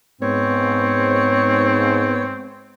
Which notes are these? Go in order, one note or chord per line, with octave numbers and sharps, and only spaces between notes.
G#2 B3 C4 C#5